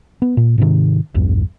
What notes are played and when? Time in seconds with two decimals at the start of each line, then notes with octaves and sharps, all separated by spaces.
0.22 B3
0.37 A#2
0.58 G#2 C3 D#3
1.15 A#1 E2 G2